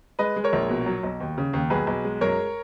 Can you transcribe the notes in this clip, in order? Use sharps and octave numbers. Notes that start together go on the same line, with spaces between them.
G#3 B4 D#5
G#3
A#4 C#5
A#1
B2
F#3
B1
D#2
C#3
D#2
B1 G#4 B4
B1
G#3
F#2 A#4 C#5